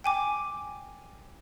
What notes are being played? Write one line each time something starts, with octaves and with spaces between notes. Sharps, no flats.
G5 G#5 D6